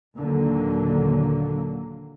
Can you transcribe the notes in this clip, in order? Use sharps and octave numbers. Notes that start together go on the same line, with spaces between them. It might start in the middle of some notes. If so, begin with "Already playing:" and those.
D#2 A#2 D3 F#3 A#3